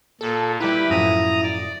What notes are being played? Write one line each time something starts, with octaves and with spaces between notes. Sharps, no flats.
A#2 A4
G3 E4 G4 B4 G5 A#5
F#2 A2 F3 A#5 D#6
D5